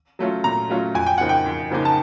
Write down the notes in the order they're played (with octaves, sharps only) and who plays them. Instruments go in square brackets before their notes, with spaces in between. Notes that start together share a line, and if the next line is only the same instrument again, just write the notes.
[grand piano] F#3 A3 C#4 F4
A#2 A#5
F#3 A3 C#4 F4
F2 G#5
G5
C#3 F3 A#3 D#4 F#5
G5
F2
C#3 F3 A#3 D#4
A5